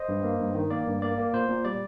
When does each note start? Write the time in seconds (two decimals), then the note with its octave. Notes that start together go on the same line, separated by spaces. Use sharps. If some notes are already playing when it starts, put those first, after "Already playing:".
Already playing: C5 D#5
0.09 G2
0.24 A#3
0.39 G2
0.55 D#3
0.70 A#3 D5
0.87 G2
1.02 A#3 D5
1.18 A#3
1.33 A#2 C5
1.49 A#2
1.65 G3 D5